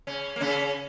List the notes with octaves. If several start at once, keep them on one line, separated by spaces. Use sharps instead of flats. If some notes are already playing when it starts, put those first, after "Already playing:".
C#3 C#4
A#3
C#3 C#4